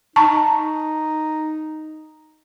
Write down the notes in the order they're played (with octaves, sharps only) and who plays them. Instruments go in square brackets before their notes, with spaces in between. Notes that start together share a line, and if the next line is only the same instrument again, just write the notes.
[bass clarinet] D#4 [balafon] A5 A#5 C#6